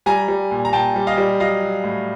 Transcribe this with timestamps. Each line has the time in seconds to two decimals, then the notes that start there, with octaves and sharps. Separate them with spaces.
0.06 G3 G#5 A#5
0.28 G3
0.51 A#2
0.65 A#5
0.73 A#2 G5 A5
0.96 G3
1.07 D#5 F5
1.18 G3
1.40 F#3 D#5 F5
1.62 F#3
1.84 A2